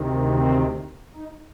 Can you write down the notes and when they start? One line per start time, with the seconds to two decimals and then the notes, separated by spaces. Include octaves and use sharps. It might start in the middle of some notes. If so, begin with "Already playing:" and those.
Already playing: D2 C3 D#3
0.28 C4
1.15 D#4